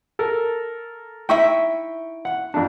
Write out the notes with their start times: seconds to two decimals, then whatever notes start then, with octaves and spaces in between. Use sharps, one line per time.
0.19 A4 A#4
1.29 D#4 E4 E5 G5 C#6
2.25 F#5
2.54 F2 D4